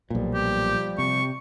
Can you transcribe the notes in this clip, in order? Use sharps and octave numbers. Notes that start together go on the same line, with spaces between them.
B1 A#2 F3 G3
G4
C3 C#6